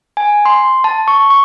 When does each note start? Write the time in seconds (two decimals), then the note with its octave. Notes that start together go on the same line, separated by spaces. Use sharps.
0.17 G#5
0.45 C6
0.84 A5
1.08 C#6
1.30 C#6